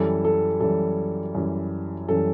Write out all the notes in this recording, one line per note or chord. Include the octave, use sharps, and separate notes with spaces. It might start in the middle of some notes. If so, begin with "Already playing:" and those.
Already playing: F#2 E3 G3 A4
A4
F#2 E3 G3 A4
F#2 E3 G3
F#2 E3 G3 A4